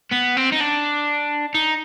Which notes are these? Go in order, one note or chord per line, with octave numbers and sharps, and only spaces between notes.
B3
C4
D#4
D4
D#4